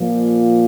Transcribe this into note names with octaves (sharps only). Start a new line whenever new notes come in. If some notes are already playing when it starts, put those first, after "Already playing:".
Already playing: A#2 F3